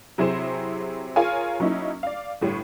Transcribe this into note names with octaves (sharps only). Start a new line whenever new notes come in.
C3 F#3 E4 G#4 C5 E7
F4 G#4 A#4 C#5 F5 G#5
F#3 A#3 C#4 D#4 E4
D5 F5
G1 A2 G3 C#5